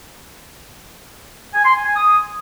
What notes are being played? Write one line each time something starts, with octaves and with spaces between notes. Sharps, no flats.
G#5
C6
G#5
G#5
D#6